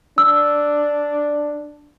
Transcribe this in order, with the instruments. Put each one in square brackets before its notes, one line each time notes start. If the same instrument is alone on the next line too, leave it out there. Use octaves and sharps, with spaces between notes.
[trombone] D4 [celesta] E6